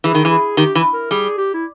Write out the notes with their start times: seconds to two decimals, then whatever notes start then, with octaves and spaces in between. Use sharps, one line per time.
0.04 E3 G#4
0.14 D#3
0.25 E3
0.31 G#4
0.57 D#3 G4
0.75 E3
0.93 A#4
1.11 G3 G#4
1.38 G4
1.54 E4